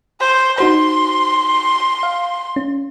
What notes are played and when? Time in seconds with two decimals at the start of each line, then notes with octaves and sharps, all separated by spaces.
0.20 C5
0.58 D#4 F#4 C5 C6
2.03 F5
2.56 C#4